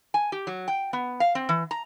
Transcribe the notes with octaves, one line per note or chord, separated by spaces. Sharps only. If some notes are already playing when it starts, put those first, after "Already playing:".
G#5
G4
F#3
G5
B3
F5
C4
E3
A#5